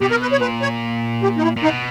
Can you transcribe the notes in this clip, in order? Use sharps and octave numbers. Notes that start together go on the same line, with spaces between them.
B2 G4
A#4
B4
C#5
A#2 B4
C#5
G4
D#4
E4
A#2
B2 D#4